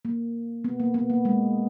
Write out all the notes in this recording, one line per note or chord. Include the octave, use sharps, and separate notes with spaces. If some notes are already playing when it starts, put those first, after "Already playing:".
A#3
B3
A#3
B3
A#3
G#3